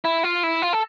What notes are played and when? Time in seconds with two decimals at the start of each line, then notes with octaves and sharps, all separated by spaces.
0.05 E4
0.23 F4
0.43 E4
0.62 F4
0.73 A4